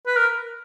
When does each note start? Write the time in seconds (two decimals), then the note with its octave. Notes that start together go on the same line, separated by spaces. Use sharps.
0.06 B4
0.16 A#4